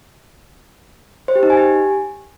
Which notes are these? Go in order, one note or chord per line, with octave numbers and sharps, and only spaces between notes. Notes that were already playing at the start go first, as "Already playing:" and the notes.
C5
G4
D#4
G#5
G4